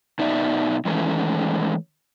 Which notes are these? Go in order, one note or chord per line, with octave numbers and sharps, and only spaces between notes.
B2 D#4 D5 E5
D#3 E3 G#3 A3 C#4